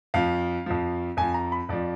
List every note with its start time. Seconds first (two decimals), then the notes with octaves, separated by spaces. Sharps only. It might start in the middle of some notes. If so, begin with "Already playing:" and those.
0.14 F2 F3 F5
0.66 F2 F3
1.17 F2 F3 G#5
1.34 A#5
1.52 B5
1.69 F2 F3 D5